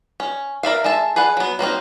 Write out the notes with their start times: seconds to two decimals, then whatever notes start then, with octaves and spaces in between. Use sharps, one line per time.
0.20 C#4
0.63 A#4 D5 E5 F5
0.84 G#3 A4 E5 A5
1.16 G#4 B4 D5 F#5
1.37 F#3 B3
1.59 F#3 A#3 C4 D#4